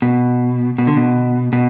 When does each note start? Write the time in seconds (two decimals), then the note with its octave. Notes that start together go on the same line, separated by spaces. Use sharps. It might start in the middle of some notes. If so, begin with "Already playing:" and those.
0.02 B2
0.78 B2
0.87 D3
0.97 B2
1.53 B2